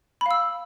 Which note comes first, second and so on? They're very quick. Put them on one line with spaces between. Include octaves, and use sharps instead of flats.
B5 F5 E6